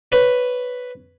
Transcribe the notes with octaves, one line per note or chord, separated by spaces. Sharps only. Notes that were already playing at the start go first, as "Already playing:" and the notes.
B4 C#5